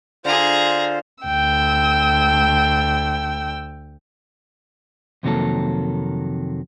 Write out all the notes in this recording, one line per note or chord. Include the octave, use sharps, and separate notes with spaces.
D3 F4 G#4 C5 A#5
D2 G5 E6
F2 C3 D#3 F#3 A#3 A4